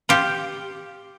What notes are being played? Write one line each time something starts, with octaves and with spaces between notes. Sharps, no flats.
F4 G4